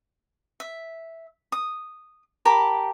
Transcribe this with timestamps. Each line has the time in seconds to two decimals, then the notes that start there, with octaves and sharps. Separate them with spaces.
0.60 E5
1.52 D#6
2.45 G4 A#4 A5 B5